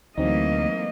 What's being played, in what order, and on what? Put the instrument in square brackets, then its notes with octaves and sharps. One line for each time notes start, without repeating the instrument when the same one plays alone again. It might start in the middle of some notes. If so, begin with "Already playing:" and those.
[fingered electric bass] D2 [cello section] E3 A3 A#3 [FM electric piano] F#3 C4 D#4 [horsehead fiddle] D#5